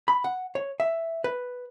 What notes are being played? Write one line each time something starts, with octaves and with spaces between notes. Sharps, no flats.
B5
F#5
C#5
E5
B4